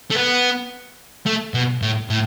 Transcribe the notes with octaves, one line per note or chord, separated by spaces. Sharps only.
A3
B3
A3
B2
A2
A2